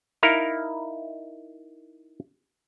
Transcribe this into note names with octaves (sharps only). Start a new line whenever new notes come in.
D#4 E4 A#4 F5